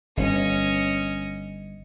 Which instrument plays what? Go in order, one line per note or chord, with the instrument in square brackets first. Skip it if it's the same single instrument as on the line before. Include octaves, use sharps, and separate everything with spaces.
[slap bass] G1 [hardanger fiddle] C#4 D#5